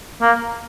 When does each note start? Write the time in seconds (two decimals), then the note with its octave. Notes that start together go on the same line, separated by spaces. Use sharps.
0.21 A#3